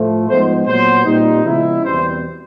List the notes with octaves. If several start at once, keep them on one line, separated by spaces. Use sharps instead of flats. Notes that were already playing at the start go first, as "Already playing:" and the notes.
Already playing: A2 F3 A3
G#2 F3 G#3 B3 C5
A#2 F#3 B3 C5
A#2 G3 C4 D#4
C#3 F3 G#3 B3 E4
E2 B2 G3 C4 C5